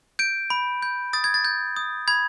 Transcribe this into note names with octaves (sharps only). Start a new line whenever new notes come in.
G6 D7
B5
G6
D#6 A6
G#6
A6
G6
D#6
B5 G#6